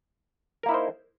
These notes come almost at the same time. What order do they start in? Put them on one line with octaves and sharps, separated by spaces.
A#4 A#3 E4 D#4 C5